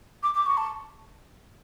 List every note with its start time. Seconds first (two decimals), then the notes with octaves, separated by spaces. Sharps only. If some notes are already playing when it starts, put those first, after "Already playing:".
0.23 D6
0.34 D6
0.46 C#6
0.57 A5